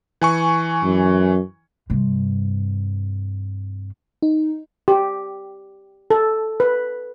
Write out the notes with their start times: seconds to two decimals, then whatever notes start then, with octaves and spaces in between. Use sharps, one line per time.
0.21 E3 G#5 C#6
0.83 F#2
1.90 G2 C3
4.22 D#4
4.88 G4
6.10 A4
6.60 B4